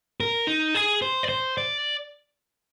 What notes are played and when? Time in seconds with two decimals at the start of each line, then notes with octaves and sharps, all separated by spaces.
0.20 A#4
0.47 D#4
0.75 G#4
1.02 C5
1.23 D5
1.29 C5
1.57 D5